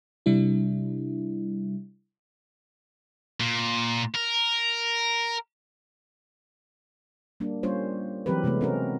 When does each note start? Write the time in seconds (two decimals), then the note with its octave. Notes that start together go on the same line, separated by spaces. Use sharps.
0.26 C3 G3 D4 E4
3.40 A#2
4.15 A#4
7.40 G3 A#3 D4
7.63 G3 A#3 C#4 F4 C5 C#5
8.26 E3 F#3 C4 G4 A#4 B4
8.44 C3 G#3 A3 B3
8.61 C4 C#4 F#4 A#4